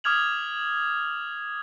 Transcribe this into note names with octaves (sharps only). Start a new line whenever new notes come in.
D6 D#6 F6 G#6 F7 F#7